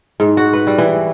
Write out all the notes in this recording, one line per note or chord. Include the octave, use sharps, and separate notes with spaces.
G#2
F#4
B4
G3
E3